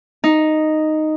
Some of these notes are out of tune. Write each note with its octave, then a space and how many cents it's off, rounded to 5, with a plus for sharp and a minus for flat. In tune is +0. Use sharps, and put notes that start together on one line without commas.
D#4 -5